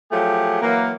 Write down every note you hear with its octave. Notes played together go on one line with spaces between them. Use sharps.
F3 F#3 A3 G4 G#4
E3 F#3 A#3